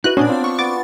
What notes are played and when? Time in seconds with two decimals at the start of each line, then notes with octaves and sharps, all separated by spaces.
0.04 D#4 E4 F#4 B4 F#6
0.17 A#2 B3 C#4 D4 D5 G#5
0.29 C4 F4 A5
0.44 C#6
0.59 B3 D6 A6